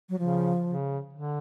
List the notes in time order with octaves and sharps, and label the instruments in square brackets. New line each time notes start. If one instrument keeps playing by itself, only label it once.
[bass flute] F#3
[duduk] C#3 [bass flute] F3
[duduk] C#3
D3